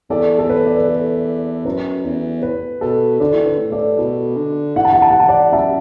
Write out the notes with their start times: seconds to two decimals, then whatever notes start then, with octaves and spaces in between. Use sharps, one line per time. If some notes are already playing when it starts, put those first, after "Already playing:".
0.10 E2 A4 D5
0.39 A4
0.49 B4
0.66 D5
0.78 B4
0.88 A4
1.65 F#2 B4
2.04 E2
2.42 B4
2.81 B2 A4
3.20 D3 A4 D5
3.33 E3
3.43 D3 B4
3.59 A2
3.72 A4 D5
3.98 B2 A4
4.37 D3
4.76 E3 F#5
4.85 A5
4.93 F#5
5.02 A5
5.11 E3 F#5
5.20 A5
5.28 D5 F#5
5.53 F#2 E5 A5